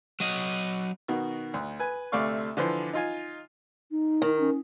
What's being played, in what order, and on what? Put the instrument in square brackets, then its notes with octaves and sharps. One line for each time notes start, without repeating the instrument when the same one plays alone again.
[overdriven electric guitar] F#3 D#5
[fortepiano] B2 D#3 F#4
D2
B4 G#5
D2 C3 A3 D5 F5 C#6
D3 E3 F3 B4 C5
D#4 F4 G#5
[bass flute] D#4
[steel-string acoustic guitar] D#3
[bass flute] C#4